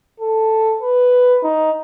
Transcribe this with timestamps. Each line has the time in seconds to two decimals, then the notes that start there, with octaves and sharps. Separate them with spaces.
0.20 A4
0.81 B4
1.43 D#4